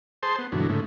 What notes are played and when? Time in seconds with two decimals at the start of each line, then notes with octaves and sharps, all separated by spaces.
0.23 G#4 C5 A5 C6
0.39 B3
0.52 G2 B2 D3 E3 F#3
0.69 G#2 C#3 A3